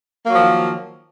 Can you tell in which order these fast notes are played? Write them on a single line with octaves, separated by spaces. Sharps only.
A#3 F#3 F3 D#3